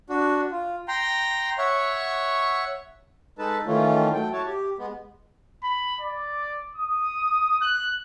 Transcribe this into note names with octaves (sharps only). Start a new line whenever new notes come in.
D4 F#4
F4
G5 A#5 C6
C#5 E5 F#5 C#6
G#3 D#4 A4 B4 A5
D#3 E3 A3 C#4 F4
F#3 A3 G5
E4 F#4 C#5 A5
G4
G#3 B3
B5
D5
D#6
F#6